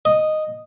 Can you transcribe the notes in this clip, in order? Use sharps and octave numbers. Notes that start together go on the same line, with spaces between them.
D#5